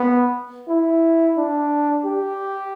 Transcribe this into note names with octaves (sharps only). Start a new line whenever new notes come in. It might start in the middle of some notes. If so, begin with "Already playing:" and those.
Already playing: B3
E4
D4
G4